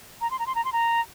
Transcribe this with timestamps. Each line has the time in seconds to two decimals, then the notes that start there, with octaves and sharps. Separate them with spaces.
0.21 A#5
0.31 C6
0.39 A#5
0.47 C6
0.55 A#5
0.65 C6
0.73 A#5